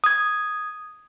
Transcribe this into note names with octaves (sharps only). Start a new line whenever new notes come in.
D#6 G#6